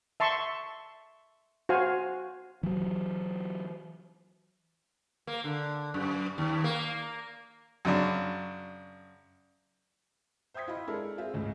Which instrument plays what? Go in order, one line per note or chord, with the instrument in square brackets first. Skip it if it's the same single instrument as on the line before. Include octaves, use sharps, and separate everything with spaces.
[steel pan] E5 A5 C6 C#6
F#4 C5 F5 G#5
[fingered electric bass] E3 F#3
[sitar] A#3
D3
F#2
D#2
A#3
[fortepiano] F#2 C#3 D4
[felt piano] C5 E5 G5 D#6 G#6 B6
E4 F4 D#5 B5
G#3 D4 E4 A4 A#4
C4 F4 G#4 E5
C#2 A2 C#3